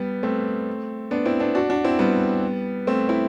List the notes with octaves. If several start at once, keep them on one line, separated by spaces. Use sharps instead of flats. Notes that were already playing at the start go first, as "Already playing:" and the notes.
Already playing: G3 B3
A3 C4
B3 D4
C4 E4
B3 D4
D4 F#4
D4 F#4
C4 E4
G3 B3
A3 C4
C4 E4